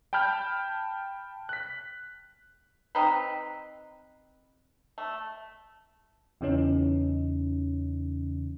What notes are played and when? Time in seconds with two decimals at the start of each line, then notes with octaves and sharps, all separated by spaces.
0.13 G5 A5 B5 F6 G6
1.49 F#6 B6
2.95 C4 D#4 B4
4.98 A3
6.41 E2 C#3 E3 C#4 D#4